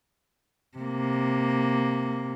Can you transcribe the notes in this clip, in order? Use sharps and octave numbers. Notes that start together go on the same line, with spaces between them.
C3 A#3